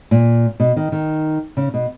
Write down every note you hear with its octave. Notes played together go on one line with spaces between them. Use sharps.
A#2
B2
D#3
D#3
C#3
B2